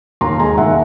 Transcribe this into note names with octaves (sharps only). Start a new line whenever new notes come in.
D#2 A#5 C6
G#3 G#5 A#5
D#2 E5 F#5